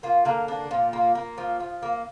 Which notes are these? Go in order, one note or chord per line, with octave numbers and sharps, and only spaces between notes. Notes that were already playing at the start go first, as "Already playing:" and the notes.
A#3 F4
D3 A#3 A#4
A#3 D4
A#2 F4
A#3
A#3
F3
F3
A#3